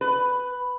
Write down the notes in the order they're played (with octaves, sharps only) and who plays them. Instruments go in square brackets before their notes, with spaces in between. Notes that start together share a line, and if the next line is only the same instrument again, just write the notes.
[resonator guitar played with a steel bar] B4